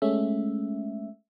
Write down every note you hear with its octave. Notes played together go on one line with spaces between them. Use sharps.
G#3 A3 C#4 E5